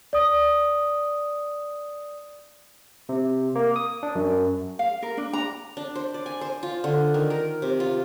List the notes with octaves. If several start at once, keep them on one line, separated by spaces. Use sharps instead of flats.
D5 D#6
C3
A#3
D#6
D4
F#2
F5
A#4
D4
A#5
D4
C5
D5
G#5
C5
F4
D3
D#3
A#4
C3
F4